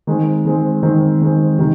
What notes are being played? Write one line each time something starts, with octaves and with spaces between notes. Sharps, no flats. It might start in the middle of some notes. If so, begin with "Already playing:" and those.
D#3 G#3 C4
D#3 G#3 C4
D#3 G#3 C4
D#3 G#3 C4
C3 D#3